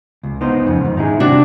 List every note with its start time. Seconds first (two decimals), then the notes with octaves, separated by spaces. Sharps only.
0.23 C#2
0.41 B3 D#4 C5
0.66 F2 C#3
0.81 G#2 D#3
0.97 D#4 E4 G#4
1.20 C3 D4 F#4